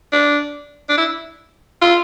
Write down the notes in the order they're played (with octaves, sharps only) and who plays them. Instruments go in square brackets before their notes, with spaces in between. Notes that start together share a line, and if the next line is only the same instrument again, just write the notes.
[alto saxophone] D4
D4
E4
F4